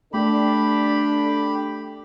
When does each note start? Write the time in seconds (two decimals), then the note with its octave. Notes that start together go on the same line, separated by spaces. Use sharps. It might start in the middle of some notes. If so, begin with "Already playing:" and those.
0.13 A3 D4 G4 A4 B5